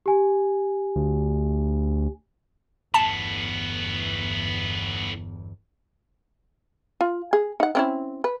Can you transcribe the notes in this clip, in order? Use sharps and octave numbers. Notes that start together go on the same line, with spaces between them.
G4 G#5
D2
G1 E2 A2 B3 A5
F4
G#4
D#4 F#5
C4 C#4 E4
B4